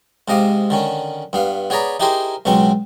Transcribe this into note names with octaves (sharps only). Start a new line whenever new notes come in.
G#2 C3 D#5 F5 D6
D3 D#3 C#4
G2 B3 F5
B3 G#4 C#5 D5 A#5 B5
D#4 E4 G4 G#4 A#4 C5
C#2 B2 F#3 C4 C#6